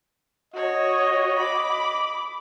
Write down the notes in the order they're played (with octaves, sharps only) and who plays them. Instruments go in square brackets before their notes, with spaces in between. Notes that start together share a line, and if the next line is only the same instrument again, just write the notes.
[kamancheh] F#4 C#5 [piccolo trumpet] D#5
[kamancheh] B5 D6